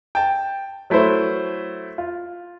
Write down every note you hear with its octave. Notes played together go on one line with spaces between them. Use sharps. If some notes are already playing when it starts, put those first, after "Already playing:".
G5 A5
F#3 A3 E4 B4 C5
F4